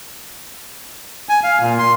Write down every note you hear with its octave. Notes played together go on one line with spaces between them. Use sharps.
G#5
F5
A#2
C6